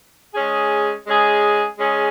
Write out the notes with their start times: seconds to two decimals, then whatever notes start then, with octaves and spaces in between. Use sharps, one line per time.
0.34 G#3 C#4 G#4
1.06 G#3 C#4 G#4
1.78 G#3 C#4 G#4